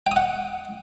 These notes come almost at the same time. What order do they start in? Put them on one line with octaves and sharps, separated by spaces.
G5 D#6 F#5